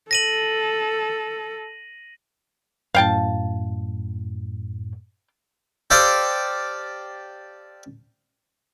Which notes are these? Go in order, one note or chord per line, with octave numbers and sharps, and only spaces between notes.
A4 A#6 D#7 F#7
F#2 A2 F5 G5 A5
G4 A4 C5 D5 F5